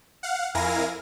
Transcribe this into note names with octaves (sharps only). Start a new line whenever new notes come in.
F5 F#5
F2 E4 A#4 F5 G#5 A#6